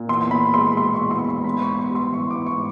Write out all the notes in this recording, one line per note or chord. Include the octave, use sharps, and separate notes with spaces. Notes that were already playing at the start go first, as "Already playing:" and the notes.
Already playing: A#2
E2 C6
E2 B5
G#3 C6
B2 C6
C#6
E2
C6
E2
C6
G#2 B5
C#6
B3
C6
G3 C6
E3 C#6
D6
G#2
C#6